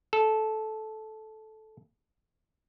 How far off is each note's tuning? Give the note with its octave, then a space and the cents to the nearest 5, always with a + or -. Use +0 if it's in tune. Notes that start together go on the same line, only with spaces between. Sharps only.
A4 -15